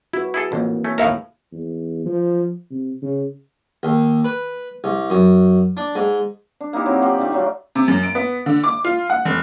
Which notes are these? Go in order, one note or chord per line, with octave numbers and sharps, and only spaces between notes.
E4 F#4 B4
E4 G#4 A4
A1 F2 C3 E3 A#3
A3 C#4
D#2 A2 A#4 E5 F5
E2
F3
C3
C#3
D#2
B4
C2
F#2
D4
G#2
D4
A#3 D#4 E4 G4
F#3 C4 D#4 F#4
F4 G4 G5 B5
D3 F3 A3
F#3 D4 F4
C3
F#2
D7
B3
D3
D6
F4
F#5
F1